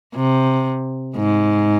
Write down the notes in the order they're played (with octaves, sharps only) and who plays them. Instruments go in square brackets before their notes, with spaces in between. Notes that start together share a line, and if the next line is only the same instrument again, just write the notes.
[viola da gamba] C3
G#2